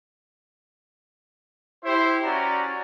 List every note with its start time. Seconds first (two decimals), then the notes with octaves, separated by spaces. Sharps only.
1.85 E4 G4 C5
2.24 C#4 F#4 D5 A#5